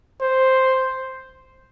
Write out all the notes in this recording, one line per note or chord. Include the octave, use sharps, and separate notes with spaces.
C5